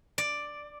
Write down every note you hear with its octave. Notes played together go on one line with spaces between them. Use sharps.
D5